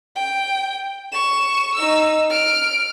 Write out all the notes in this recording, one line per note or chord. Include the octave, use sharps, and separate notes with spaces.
G5
C#6 E7
D#4 E6
F6 D7